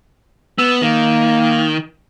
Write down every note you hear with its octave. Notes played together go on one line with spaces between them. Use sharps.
B3 E6
D#3 A#3